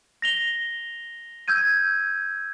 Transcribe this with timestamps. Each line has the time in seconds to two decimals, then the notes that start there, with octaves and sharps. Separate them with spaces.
0.22 A#6 F7 G7
1.48 E6 G6 G#6 D#7